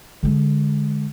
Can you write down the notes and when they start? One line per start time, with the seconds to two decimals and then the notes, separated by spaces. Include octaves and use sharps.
0.23 D3 G#3